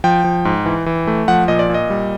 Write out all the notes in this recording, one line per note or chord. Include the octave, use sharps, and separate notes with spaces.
F3 G5
F3
G#2
E3
E3
A3
F3 F#5
A#2 D#5
D5
A#2 D#5
G3